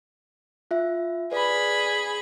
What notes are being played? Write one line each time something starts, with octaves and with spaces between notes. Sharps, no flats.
F4 E5
G#4 B4 D5 B5